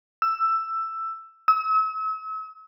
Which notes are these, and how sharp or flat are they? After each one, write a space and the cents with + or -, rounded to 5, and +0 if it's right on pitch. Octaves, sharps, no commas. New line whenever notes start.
E6 +10
E6 -40